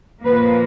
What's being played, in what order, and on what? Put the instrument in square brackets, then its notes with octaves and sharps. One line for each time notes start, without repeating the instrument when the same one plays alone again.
[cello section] A#2 F3 A#3 B4